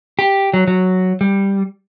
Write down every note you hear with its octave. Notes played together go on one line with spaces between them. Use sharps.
G4
F#3
F#3
G3